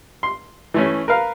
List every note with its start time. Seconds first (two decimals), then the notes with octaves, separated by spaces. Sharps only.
0.23 C6
0.74 E3 A3 C#4
1.08 A#4 B4 F5